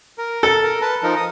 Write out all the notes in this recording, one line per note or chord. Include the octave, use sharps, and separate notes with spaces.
A#4
A4
A#4
B4 A5
F3 D#4 A#4
D#6